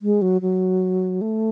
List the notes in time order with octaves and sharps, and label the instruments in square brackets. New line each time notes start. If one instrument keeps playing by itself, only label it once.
[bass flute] G#3
F#3
F#3
A3